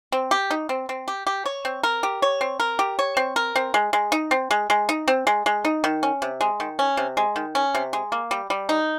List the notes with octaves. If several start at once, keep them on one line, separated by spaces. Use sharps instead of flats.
C4
G4
D#4
C4
C4
G4
G4
C#5
C4
A#4
G4
C#5
C4
A#4
G4
C#5
C4
A#4
C4
G#3
G#3
D#4
C4
G#3
G#3
D#4
C4
G#3
G#3
D#4
D#3
C#4
C3
G#3
D#3
C#4
C3
G#3
D#3
C#4
C3
G#3
A#3
G3
G3
D#4